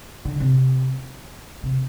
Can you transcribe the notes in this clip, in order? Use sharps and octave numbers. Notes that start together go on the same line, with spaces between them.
D3
C3
C3